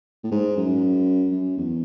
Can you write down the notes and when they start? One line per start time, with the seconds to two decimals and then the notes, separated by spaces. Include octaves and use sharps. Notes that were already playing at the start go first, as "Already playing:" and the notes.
0.24 A2
0.31 G#2
0.57 F#2
1.32 F#2
1.57 E2